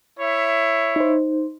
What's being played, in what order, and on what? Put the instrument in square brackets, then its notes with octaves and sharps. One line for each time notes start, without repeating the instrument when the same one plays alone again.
[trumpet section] E4 C#5 E5
[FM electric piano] D#4 C5